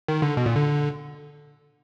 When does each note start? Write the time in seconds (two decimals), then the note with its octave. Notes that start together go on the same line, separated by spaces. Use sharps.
0.08 D#3
0.22 D3
0.37 B2
0.46 A#2
0.55 D3